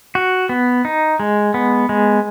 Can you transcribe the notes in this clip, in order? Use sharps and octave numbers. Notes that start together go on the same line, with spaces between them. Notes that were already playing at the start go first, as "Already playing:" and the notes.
F#4
B3
D#4
G#3
B3
G#3